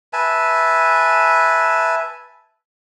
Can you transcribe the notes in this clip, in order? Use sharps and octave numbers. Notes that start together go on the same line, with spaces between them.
B4 E5 G#5 A5